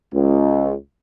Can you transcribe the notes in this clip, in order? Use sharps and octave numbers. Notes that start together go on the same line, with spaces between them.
C#2